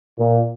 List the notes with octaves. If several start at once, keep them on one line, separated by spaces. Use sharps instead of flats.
A#2